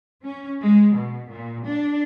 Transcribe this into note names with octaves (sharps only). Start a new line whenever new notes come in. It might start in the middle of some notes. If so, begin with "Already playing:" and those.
C#4
G#3
B2
A#2
D4